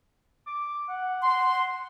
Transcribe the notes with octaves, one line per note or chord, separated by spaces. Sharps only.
D6
F#5
C6